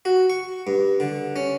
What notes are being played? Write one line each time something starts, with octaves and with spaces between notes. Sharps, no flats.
F#4
C#6
G2
D3
C#4